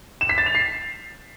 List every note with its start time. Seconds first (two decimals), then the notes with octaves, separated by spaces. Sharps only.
0.21 E7
0.29 B6
0.38 A6
0.46 F7
0.55 C7